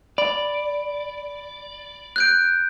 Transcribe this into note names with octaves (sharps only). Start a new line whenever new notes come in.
D5 B5
F#6 G6 D7